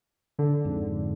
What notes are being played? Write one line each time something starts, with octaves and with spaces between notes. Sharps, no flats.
D3
F2 G#2